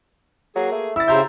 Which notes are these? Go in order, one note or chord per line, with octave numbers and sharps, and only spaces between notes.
F#3 A#3 G#4
A3
E4 E6 A6
C#3 F#4 G4 C5 E5 A#5 G6